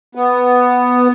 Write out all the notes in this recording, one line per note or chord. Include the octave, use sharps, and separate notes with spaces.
B3